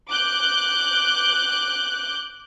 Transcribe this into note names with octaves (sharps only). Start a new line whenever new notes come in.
D6 F#6 G6